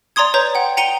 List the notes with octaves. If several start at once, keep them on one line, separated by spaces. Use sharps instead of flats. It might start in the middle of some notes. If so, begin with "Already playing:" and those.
D5 A#5 C6 D#6 G#6
B4 C#5 A#5 G6
F#5 G5
G5 A#5 C#7 D#7 F7 G7